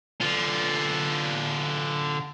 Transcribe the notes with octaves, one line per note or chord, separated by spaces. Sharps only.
D3 F4